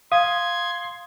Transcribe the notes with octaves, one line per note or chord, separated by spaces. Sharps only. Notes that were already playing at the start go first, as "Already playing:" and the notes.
F5 C6 D#6 G#6